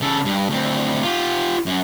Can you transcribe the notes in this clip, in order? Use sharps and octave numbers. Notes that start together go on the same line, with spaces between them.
C#3 A4
G2
D2 C4
F4 G4
F#2